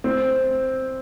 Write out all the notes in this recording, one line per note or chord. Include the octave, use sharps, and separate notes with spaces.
C4